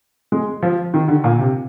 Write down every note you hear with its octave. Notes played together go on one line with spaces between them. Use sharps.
G#3
F3
D#3
D3
A#2
C3